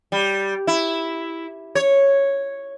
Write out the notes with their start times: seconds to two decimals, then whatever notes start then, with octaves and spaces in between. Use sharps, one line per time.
0.12 G3
0.67 E4
1.75 C#5